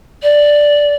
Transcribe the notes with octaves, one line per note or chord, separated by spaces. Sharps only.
D5